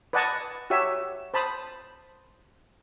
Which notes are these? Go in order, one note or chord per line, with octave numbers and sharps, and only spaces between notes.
B4 D5 D#5 F#5 G#5 A5
F#4 G4 C#5 E5
C5 A5 B5 D#6